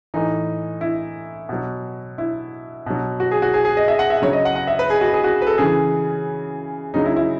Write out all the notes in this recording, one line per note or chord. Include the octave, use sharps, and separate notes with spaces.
A2 E3 D#4
E4
B2 F#3
E4
B2 F#3
F#4
G#4
F#4
G#4
G#4
D#5
E5
F#5
E5
C#3 F#3 C#5
D#5
F#5
F#5
E5
B4
G#4
F#4
G#4
F#4
B4
A4
C#3 E3 G#4
C#3 F#3 D#4
E4
E4